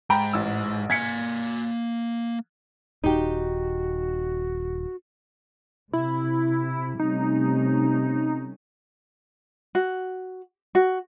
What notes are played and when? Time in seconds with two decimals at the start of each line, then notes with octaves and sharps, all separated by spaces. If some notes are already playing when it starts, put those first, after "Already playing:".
0.10 G#2 G5 A#5 B5
0.33 A1 E6
0.90 A#3 G#5 G#6 B6 C#7
3.04 D#1 D#4 F#4 G4
5.93 C3 E4
6.99 C3 G3 A3 C#4 D#4
9.75 F#4
10.75 F#4